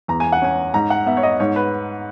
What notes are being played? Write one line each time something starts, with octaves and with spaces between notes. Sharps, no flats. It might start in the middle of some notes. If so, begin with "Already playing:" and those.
E2 A#5
G#5
F#5
C#4 G#5
G#2 A#5
F#5
B3 E5
C#5
D#5
G#2 C#5
B4